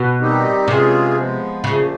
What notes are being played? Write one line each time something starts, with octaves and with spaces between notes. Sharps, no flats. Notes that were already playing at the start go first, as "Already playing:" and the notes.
Already playing: B2
D#3 G3 C4 D#4 G4
C3 E3 G#3 C#4 F4 G#4
F3 G#3 B3
A#2 C#3 F3 A3